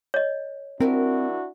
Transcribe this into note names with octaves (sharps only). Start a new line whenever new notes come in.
C#5 D#5
F#3 G3 C4 D4 E4 F#4 A#4